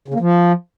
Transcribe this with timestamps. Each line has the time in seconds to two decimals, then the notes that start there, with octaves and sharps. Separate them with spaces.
0.08 C#3
0.14 A#3
0.20 F3